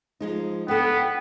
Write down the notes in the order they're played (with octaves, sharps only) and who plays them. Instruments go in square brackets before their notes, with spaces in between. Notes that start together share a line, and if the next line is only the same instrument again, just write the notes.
[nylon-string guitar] F3 G#3 D#4
[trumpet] B3 [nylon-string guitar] D4 A4 [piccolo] G5